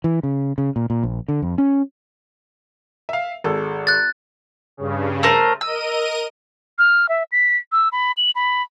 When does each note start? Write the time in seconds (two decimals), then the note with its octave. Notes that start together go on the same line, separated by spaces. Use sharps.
0.04 E3
0.23 C#3
0.58 C#3
0.76 A#2
0.90 A#2
1.03 A#1
1.28 D3
1.42 F2
1.58 C#4
3.09 E5 F5
3.44 G#1 G#3 A4
3.87 F#6 A6
4.77 G2 C#3
5.23 A3 A#4 C5
5.61 A#4 D#5 E6 D#7
6.79 F6
7.09 E5
7.32 B6
7.72 E6
7.92 B5
8.17 F#7
8.36 B5